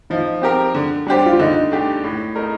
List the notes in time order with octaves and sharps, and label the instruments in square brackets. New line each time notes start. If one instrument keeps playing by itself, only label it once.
[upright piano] F3 [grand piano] D#4
[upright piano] C4 G4 A#4
D3
G3 D4 G4 C5
[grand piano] F4
[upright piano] D3 [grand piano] D#4
[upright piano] A3 D4 G4
A2
A3 D#4 A#4